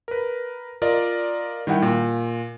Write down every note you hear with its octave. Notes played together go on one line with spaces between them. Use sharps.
A#4 B4
F4 A#4 D5 D#5
D#3 G3 E4 F#5 G5
A#2